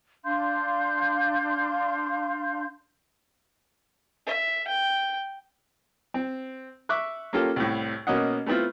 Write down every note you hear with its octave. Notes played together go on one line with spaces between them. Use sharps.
D4 F5 C6 G6
E5
G5
C4
E5 C#6 D6 F#6
A#3 C#4 F4 G4 A4
C2 A2
B2 A#3 C#4 D#5 F#5
A3 B3 C4 E4 F4